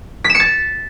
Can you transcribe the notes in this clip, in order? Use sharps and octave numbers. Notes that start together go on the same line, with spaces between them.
B6
E7
C#7
A6